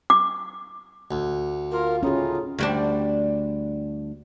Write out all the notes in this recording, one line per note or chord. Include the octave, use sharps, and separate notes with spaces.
D6
D2
F4 A#4
A2 C#4 D#4 F4 G#4
D2 G3 D4